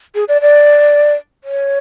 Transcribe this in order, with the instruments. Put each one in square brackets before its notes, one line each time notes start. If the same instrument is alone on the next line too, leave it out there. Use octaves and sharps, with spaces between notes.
[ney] G#4
D5
D5
C#5